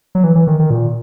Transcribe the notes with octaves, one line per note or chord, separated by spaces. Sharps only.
F#3
E3
E3
D#3
D#3
A#2